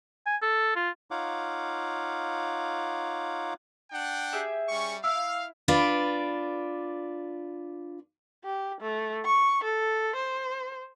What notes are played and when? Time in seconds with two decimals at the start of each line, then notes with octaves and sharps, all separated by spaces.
0.26 G#5
0.42 A4
0.76 F4
1.11 D#4 F4 C#5 F5 F#5 D6
3.91 D4 F#5 G5
4.33 G4 G#4 E5
4.69 G3 C#4 C#6
5.04 E4 F5 E6 F6
5.68 D4 F4 B4 D5
8.44 G4
8.81 A3
9.25 C#6
9.64 A4
10.16 C5